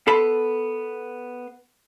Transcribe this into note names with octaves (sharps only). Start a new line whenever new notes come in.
B3 A4 B5 C6